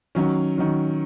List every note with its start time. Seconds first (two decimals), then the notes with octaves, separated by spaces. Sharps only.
0.15 D#3 F#3 C#4
0.58 D#3 F#3 C#4